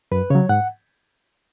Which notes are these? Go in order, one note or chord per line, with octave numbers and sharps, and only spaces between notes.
F#2 B4
C#3 F#3 C#5
G#2 F#5